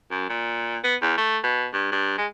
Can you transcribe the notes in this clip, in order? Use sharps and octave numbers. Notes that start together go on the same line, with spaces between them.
F#2
A#2
B3
E2
A3
B2
G2
G2
G#3